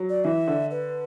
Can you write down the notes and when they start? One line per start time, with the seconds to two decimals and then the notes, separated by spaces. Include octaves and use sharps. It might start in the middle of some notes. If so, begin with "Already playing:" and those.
Already playing: F#3
0.09 D5
0.24 E3 E5
0.48 D3
0.71 B4